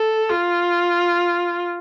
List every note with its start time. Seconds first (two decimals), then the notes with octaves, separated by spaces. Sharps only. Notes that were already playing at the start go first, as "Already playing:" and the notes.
Already playing: A4
0.29 F4